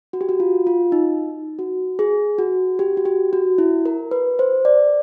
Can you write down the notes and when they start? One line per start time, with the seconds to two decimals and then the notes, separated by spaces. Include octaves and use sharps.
0.13 F#4
0.21 G4
0.29 F#4
0.40 F4
0.67 F4
0.92 D#4
1.59 F#4
1.99 G#4
2.38 F#4
2.79 G4
2.97 F#4
3.05 G4
3.33 F#4
3.58 E4
3.85 A#4
4.11 B4
4.39 C5
4.65 D5